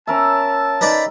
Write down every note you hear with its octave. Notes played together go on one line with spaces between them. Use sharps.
C#4 A#4 E5 A5
D#4 B4 D5